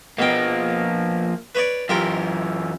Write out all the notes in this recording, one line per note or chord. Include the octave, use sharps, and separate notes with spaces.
B2 F3 A#3 G5
B4 C#5 D5
F#2 E3 F4 G4 A#4